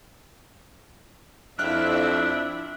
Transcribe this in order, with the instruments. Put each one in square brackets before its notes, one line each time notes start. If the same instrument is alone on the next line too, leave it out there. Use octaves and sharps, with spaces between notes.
[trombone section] F2 [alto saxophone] D4 [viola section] E4 E5 [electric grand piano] F6 F#6